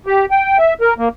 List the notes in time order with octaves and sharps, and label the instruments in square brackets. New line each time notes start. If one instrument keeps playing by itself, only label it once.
[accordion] G4
G5
E5
A#4
A#3